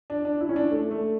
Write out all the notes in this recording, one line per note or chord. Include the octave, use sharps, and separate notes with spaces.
D4
D4
E4
C#4
D4
A3
A3